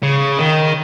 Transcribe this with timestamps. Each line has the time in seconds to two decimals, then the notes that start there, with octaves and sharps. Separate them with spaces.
0.03 C#3
0.38 D#3